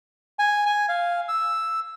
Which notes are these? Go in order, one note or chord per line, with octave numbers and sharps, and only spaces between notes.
G#5
G#5
F5
E6